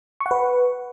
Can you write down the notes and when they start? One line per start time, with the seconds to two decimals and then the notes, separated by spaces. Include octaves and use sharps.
0.20 C#6
0.26 F#5
0.31 B4